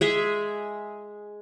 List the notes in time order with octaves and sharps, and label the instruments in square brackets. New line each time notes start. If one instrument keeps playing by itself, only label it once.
[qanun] G#3 G#4 E5